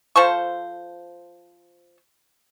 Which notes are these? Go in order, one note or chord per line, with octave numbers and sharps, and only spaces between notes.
F3 A4 C5 C#6